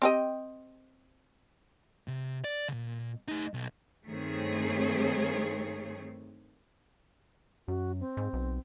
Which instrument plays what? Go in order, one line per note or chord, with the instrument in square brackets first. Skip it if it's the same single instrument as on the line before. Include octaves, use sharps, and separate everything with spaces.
[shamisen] C4 G4 D#5
[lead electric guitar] C3
D5
A#2 C#3
A3 D#4
B1
[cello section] G2 D#3 A3 C4 G#4 C#5
[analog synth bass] F#2 [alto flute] F#4
[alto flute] C4
[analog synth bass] G#2
B1